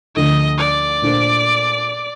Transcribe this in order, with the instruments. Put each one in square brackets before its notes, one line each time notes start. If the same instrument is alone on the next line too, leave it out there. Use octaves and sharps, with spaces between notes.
[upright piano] D2 D3 F3 A3 [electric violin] D#5
[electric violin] D5
[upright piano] A#2 A3 D4 A4 C5